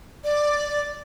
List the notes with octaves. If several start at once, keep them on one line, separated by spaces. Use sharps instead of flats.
D5